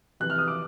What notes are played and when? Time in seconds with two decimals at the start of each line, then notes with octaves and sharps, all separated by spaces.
0.20 F2 C3 E3 F#6
0.30 F6
0.39 D#6
0.48 D6